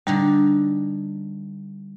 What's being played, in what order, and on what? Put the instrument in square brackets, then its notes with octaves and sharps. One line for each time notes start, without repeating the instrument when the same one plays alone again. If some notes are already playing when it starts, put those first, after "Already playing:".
[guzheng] D3 D4 D#4 [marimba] G3